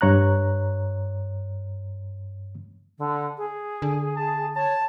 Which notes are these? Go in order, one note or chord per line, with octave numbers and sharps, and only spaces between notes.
G2 C#5 A#5 F#6
D3
G#4
D3
A5
C#5 A5